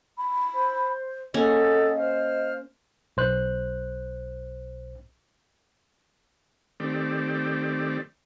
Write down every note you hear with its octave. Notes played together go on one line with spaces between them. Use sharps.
B5
C5
A#3 C#4 G#4 A4 D#5 F#5
C5 F5 F6
B1 C5 F#6
D#3 A3 C4 G4 D5